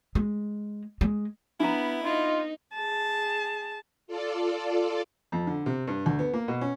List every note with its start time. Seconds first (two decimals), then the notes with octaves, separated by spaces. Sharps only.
0.15 G#3
1.01 G#3
1.60 B3 D4 E4 A#5
2.05 D#4 F4
2.75 G#4 A5
4.07 F4 A4 D5
5.32 F2
5.47 D3
5.66 C3
5.87 G2
6.06 D2
6.19 B3
6.34 A#3
6.48 B2
6.61 C#4